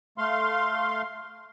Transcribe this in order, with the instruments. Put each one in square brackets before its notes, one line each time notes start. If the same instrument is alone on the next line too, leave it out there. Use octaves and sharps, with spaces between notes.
[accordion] A3 F5 C6